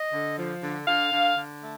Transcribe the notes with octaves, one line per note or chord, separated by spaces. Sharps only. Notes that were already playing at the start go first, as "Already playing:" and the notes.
Already playing: D#5
D3
F3
D3
D3 F5
D3
D3
A3